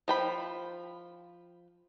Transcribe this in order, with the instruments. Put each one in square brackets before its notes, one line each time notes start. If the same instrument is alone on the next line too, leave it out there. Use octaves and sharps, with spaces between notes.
[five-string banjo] F3 G5 B5